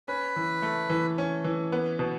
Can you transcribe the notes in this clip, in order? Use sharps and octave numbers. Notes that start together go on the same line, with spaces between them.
C#4 B4
E3
A3
E3
C#4
E3
B3
B2